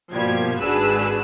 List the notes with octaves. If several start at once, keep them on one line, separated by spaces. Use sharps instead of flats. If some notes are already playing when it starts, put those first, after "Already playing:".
G2 B2 F3 G3 A#3 G#6
G#1 D4 F#4 G#4 B4 E6